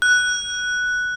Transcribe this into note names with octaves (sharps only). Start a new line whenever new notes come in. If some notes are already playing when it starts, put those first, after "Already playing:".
F#6